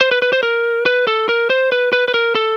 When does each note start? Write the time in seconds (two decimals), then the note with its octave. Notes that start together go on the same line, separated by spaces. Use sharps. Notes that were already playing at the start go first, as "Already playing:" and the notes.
0.01 C5
0.11 B4
0.22 B4
0.33 C5
0.43 A#4
0.86 B4
1.07 A4
1.29 A#4
1.50 C5
1.72 B4
1.93 B4
2.08 B4
2.14 A#4
2.35 A4